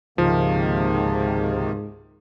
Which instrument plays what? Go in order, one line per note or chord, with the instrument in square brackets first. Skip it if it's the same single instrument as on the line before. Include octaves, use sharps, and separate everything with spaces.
[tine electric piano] C#2 [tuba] G#2 [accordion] C3 D#3 A#3 [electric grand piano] F3